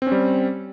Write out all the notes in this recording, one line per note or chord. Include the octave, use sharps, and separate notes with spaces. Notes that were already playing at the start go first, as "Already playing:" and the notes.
G3 C4 C#4